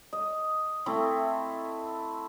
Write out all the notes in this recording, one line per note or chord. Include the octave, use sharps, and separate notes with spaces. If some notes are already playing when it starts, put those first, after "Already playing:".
D#5
A3 C4 E4